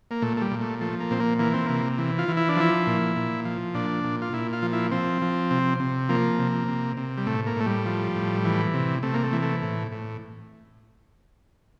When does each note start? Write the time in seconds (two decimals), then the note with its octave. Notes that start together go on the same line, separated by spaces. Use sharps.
0.11 A#3
0.22 A#2 A3
0.37 A3
0.41 G3
0.51 A#2
0.61 A3
0.81 F3 A3
1.00 A#3
1.11 A#2 C4
1.20 A#3
1.39 E3 A#3
1.53 C4
1.66 C3 A#3
1.98 E3
2.18 F4
2.28 E3
2.37 E4
2.49 D4
2.57 F3 E4
2.87 A#2
3.16 A#2
3.45 F3
3.74 A#2 D4
4.04 A#2
4.22 F4
4.33 A#2 E4
4.53 F4
4.62 F3
4.73 E4
4.91 F3 C4
5.22 F3
5.51 C3
5.80 C3
6.09 F3 A#3
6.39 C3
6.68 C3
6.97 C3
7.17 G3
7.26 A2 A3
7.46 A#3
7.56 A2 A3
7.66 G3
7.86 F3
8.15 A2
8.45 E3
8.74 C3
9.03 C3 A3
9.14 A#3
9.23 A3
9.33 E3
9.42 A3
9.62 A2
9.92 A2